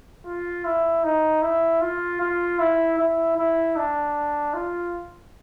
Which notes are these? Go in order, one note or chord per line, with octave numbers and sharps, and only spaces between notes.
F4
E4
D#4
E4
F4
F4
E4
E4
E4
D4
F4